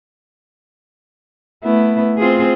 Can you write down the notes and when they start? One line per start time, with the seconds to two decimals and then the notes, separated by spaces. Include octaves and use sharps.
1.64 A3 B3 E4
2.18 C4 F4 G#4